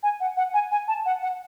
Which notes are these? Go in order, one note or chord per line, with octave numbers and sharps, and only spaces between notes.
G#5
F#5
F#5
G#5
G#5
A5
F#5
F#5